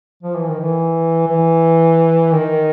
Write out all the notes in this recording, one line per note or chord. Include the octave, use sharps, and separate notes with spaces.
F3
E3
D#3
E3
E3
D#3